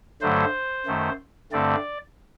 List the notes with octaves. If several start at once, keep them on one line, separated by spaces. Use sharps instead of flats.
G2 D3 F#3 A3 C5
F#2 D#3 A3
G2 D3 A3 C4 D5